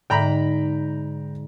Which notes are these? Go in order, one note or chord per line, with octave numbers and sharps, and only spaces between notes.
G#2 D3 G5 A#5 B5